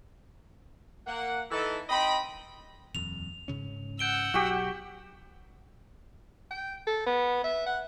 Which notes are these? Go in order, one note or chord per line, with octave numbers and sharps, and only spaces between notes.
A#3 F#5
E3 D#4 E4 A4
C4 D#4 D#5 G5 B5
D#1 F2 F7
G#2 C#3 C#4
F#5 E6 G6 D7 G7
B1 F#3 F#4 G4
G5
A4
B3
E5
F#5